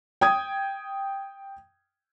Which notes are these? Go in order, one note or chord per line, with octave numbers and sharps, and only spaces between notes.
G5 D#6 G#6